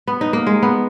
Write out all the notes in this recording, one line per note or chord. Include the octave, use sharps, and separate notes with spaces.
B3
D#4
A#3
G#3
B3